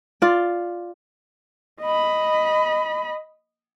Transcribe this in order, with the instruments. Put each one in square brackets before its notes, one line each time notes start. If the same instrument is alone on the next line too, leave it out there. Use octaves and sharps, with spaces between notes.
[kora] F4 D5
[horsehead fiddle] D#5 B5